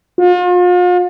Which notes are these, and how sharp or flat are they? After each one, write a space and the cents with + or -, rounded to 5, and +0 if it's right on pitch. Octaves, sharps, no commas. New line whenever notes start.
F4 +40